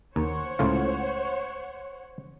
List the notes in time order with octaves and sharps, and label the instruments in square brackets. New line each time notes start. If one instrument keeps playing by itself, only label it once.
[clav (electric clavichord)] D#2 [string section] C5 C#5 F#5
[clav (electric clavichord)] C#2 A2 F4